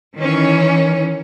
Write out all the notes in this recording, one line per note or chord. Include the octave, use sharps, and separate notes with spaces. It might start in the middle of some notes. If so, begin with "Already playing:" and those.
D#3 E3 C#4